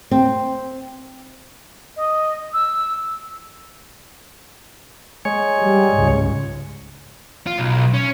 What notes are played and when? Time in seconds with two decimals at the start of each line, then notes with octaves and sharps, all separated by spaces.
0.11 C4
1.96 D#5
2.54 E6
5.25 G#3 C#5
5.61 G3
5.95 C#2 G#2
7.47 F4
7.58 B1
7.94 C#4